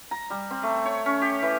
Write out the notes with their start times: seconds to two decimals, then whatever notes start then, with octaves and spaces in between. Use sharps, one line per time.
0.11 A#5
0.30 G3
0.51 C4
0.63 A3
0.85 C#5
1.06 C#4
1.21 G4
1.42 E3